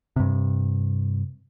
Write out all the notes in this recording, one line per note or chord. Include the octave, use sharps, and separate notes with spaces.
G2 C3